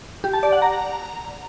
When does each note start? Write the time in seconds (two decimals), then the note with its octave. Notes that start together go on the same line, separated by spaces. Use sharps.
0.24 G4
0.33 A5
0.43 D5
0.52 F#5
0.62 A#5